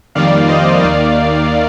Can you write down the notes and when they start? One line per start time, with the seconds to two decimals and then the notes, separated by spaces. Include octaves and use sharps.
0.15 F2 D#3 G3 A#3 D5 F5
0.49 C5 D#5
0.82 D#2 D#3 A#3 D5 F5